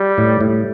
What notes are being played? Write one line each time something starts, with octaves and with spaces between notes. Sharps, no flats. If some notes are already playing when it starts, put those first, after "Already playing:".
Already playing: G3
A2
A2